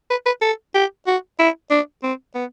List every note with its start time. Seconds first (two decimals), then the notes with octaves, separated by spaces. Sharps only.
0.10 B4
0.26 B4
0.41 A4
0.74 G4
1.07 F#4
1.39 E4
1.70 D4
2.03 C4
2.35 B3